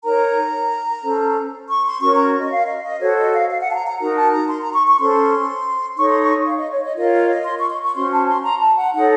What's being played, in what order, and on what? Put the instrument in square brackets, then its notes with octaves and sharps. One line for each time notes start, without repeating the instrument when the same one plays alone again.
[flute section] D#4 A#4 C#5 A#5
C#4 A4 C5
C#6
C6
C#4 F#4 A#4 C#5 C#6
A#5
D#5
F5
D#5
D#5
F#4 A4 C5 C#5
D#5
F5
F5
F#5
A5
A#5
A#5
D#4 F#4 A#4 A#5
A5
A#5
C6
A#5
C#6
C#6
C#4 A4 C5 C6
D#4 A4 C#5 C#6
C6
C#6
F5
D#5
C#5
D#5
F4 A#4 C#5 D#5
F5
D#5
C6
C#6
C6
C#6
C#4 F#4 C5 C6
A5
C6
A#5
A5
F#5
D#4 A4 C#5 F#5